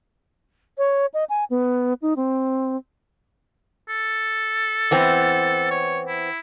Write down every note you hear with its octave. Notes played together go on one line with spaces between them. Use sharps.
C#5
D#5
G#5
B3
D#4
C4
A4
E3 B3 C4
C#5
E4